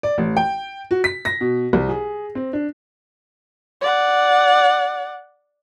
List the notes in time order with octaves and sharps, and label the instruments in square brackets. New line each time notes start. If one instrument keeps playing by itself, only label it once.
[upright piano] D5
A1
G5
F#4
B6
A#6
B2
C2
G#4
C4
D4
[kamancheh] D5 F#5